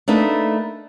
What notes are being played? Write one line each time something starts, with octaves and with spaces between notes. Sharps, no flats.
A3 A#3 D4 D#4 B4